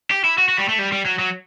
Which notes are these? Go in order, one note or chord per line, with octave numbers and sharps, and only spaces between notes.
G4
E4
F#4
F#4
G3
A3
G3
G3
F#3
F#3